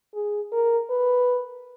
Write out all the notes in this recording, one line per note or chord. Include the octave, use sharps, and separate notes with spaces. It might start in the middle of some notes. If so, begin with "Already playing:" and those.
G#4
A#4
B4